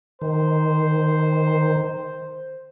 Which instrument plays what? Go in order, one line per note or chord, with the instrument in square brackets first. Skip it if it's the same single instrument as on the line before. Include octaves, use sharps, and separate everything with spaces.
[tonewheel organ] D#3 [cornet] C5